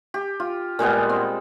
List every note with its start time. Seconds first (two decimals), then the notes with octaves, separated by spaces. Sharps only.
0.14 G4
0.40 F4
0.79 A#2 G3 G#3 B3
1.09 C4